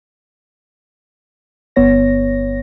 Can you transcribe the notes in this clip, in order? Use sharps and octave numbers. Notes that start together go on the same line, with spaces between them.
G1 B3 C#5 A#6